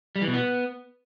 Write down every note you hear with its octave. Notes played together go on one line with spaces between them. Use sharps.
G3
E3
B2
B3